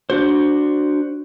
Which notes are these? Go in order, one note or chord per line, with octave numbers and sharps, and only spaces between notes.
D4 F#4 C5